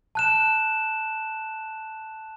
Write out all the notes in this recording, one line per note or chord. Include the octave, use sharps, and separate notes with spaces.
A5 F#6 E7